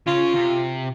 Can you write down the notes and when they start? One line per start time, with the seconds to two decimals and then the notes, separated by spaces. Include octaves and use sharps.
0.07 C#3 F4 C#5
0.35 C3